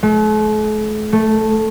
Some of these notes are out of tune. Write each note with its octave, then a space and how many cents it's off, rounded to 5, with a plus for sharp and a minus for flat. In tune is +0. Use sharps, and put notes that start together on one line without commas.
A3 -45
A3 -5